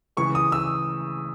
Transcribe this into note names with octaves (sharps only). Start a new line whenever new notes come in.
C#3 E3 G#3 C#6
D#6
E6